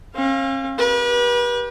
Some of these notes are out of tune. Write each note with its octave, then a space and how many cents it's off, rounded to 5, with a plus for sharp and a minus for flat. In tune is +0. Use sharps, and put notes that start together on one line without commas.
C#4 -45 F5 +0
G4 +0 B4 -35